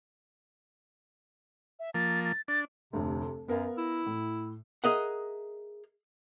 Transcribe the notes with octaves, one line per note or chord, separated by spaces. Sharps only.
E5
F3 A#3 A6
A6
D4 A6
F1 D2 C3
A4
F#2 B3 A#4 F5
E4
A2
G#4 A#4 D#5 E5 F#5